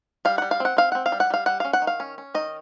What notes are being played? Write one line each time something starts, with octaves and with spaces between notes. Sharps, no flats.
G3 F5
G3 F#5
F5
C4 F#5
C4 F5
C4 F#5
F5
G3
F#5
G3 F5
G3 F#5
C#4 F5
F#5
D#3
F5
C#4
C#4
D#3 D#5